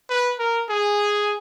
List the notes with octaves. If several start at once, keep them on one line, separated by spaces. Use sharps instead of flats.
B4
A#4
G#4